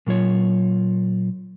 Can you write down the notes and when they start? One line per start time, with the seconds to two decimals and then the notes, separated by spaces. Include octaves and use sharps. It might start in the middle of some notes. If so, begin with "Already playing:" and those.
0.07 A#2 F#3 F4 C#5